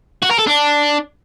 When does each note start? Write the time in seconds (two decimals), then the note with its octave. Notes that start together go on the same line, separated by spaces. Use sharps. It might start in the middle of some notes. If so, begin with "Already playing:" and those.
0.23 F#4
0.31 A#4
0.39 A4
0.47 D4